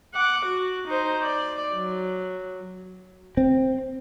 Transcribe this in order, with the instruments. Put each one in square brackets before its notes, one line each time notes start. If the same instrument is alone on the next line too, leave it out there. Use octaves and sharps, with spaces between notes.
[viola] F#5 D6
F#4
D#4 C5
D5
F#3
[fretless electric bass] C4